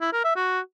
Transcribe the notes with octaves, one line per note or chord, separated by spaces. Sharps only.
E4
A#4
E5
F#4